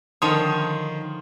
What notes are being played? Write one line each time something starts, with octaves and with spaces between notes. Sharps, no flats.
D3 D#3 F3 C#5 C6 D#6